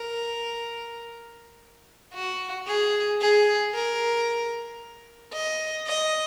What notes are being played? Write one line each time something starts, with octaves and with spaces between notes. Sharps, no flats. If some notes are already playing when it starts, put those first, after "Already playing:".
Already playing: A#4
F#4
G#4
G#4
A#4
D#5
D#5